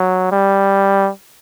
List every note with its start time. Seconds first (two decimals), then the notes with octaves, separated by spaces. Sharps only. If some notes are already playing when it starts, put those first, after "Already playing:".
Already playing: F#3
0.32 G3